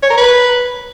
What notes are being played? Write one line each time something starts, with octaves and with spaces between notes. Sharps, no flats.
C#5
A#4
B4